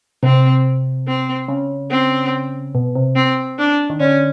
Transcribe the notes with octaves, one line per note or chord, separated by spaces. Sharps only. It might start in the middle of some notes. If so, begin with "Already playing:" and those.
C3 C4
C4
C#3
C4
B2
C3
C4
D4
D#3
D3 C#4